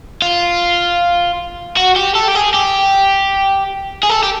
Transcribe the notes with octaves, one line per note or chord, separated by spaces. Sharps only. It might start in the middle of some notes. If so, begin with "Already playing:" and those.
F4
F#4
G4
A4
G4
G#4
G4
G#4
A4
G4